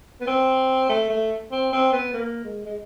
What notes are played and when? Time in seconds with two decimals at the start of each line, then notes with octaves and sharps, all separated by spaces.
0.21 B3
0.27 C4
0.89 A3
1.09 A3
1.51 C4
1.72 C4
1.92 B3
2.14 A#3
2.44 G#3
2.65 G#3